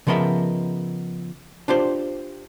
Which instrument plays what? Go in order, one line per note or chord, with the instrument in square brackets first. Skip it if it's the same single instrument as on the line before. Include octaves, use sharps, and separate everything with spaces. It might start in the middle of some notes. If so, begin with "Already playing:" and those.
[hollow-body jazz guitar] C#3 F3 B3 A#4 D#5 E5
D4 F4 G4 C5